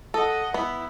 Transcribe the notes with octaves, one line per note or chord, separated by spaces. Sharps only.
A4 D#5 F#5
B3 E4